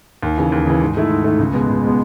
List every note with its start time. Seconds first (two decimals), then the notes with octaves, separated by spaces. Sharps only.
0.23 D#2
0.38 C#3 E3
0.52 D#2
0.67 C#3 E3
0.81 G#2
0.95 D#3 A3 E4
1.10 G#2
1.24 D#3 A3 E4
1.39 C#2
1.53 B2 G#3 B3
1.69 C#2
1.83 B2 G#3 B3